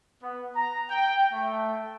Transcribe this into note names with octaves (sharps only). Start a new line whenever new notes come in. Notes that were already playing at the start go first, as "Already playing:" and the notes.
B3
A#5
G5
A3